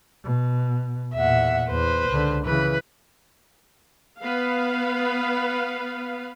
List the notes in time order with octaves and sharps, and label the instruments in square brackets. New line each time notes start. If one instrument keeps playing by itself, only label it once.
[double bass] B2
[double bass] E2 A#2 [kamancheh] E5 F#5
[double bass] E2 [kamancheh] B4 C5
[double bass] C#2 D3
[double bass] C#3 E3 [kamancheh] B4
[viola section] B3 B4 F5